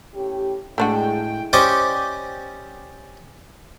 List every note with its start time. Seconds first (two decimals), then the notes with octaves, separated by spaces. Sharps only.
0.14 A2 C#4 G4
0.78 A2 G#3 A3 D4 F#4 G5
1.53 C#4 G4 C5 D5 D#5 C#6